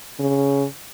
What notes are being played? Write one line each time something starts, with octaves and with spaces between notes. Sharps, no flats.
C#3